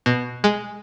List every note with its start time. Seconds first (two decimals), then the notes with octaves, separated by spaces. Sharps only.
0.06 B2
0.44 G#3